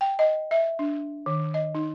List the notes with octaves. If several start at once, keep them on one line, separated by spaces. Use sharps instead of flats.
G5
D#5
E5
D4
D#3
D#5
D#4